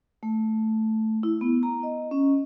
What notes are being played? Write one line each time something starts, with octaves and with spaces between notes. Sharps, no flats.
A3
E4
B3
A#5
D#5
C#4